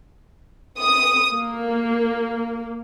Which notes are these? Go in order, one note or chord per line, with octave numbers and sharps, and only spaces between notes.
D#6
A#3